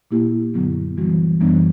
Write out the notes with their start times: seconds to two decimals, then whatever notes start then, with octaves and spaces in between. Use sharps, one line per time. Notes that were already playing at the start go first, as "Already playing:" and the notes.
0.11 A#2 A#3 E4 G4
0.54 F#2 D3 F#3 B3
0.97 E3 G3 B3 F#4
1.40 F#2 E3 G3 B3 D4